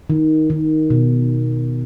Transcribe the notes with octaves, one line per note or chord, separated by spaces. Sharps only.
D#3
D#3
B2